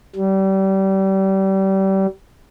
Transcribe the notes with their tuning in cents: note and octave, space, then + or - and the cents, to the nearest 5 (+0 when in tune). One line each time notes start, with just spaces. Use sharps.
G3 -30